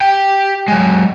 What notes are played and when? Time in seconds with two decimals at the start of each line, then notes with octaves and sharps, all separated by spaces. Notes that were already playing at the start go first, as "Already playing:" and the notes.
0.01 G4 G5
0.68 F#3 G#3